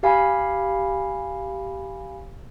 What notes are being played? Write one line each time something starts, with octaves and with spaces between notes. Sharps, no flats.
G4 F5 G#5 B5